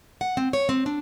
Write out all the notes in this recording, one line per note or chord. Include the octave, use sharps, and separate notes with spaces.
F#5
C4
C#5
C4
D4